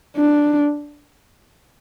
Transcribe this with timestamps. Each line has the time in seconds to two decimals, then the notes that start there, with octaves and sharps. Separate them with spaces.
0.17 D4